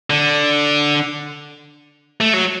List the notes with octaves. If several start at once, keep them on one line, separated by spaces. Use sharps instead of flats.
D3
A3
F#3